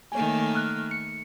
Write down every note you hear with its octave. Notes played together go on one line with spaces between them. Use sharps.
D#3 A3 A#3 C#5 G#5
F6 F#6
C#7